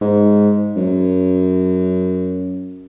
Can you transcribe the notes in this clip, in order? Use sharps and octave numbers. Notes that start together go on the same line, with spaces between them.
G#2
F#2